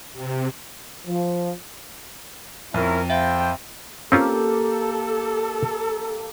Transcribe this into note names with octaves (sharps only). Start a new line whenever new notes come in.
C3
F3
F2 C#4 E4 A#4
A4 C5 E5 F5 G5 B5
A#3 C4 C#4 F4 G4 A4